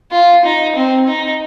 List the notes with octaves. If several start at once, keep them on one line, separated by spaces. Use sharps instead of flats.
F4
D#4
C4
D#4